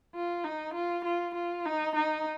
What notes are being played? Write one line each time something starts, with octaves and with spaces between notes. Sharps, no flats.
F4
D#4
F4
F4
F4
D#4
D#4